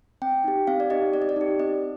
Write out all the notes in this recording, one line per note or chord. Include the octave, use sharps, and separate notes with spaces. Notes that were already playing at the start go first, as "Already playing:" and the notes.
C4 G5
D#4 G4
C4 F5
D5
D#4 G4 D#5
C4 D5
D#5
D5
D#4 G4
C4 D#5